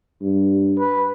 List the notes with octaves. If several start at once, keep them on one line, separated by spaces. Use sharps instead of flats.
G2
B4